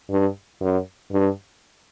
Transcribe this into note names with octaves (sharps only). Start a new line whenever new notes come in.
G2
F#2
G2